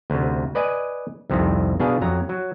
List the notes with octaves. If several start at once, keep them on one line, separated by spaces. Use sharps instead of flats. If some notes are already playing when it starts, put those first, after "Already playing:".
D2 C3
B4 D5 D#5 G#5
C2 F2 C3 D#3
B2 D4 G#4 F5
F2 F#3 A#5
F#3